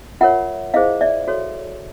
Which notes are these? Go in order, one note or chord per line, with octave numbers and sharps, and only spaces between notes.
F4 A#4 C#5 E5 F#5
E4 G#4 C5 D#5 F5
D5 E5
F#4 A4 C#5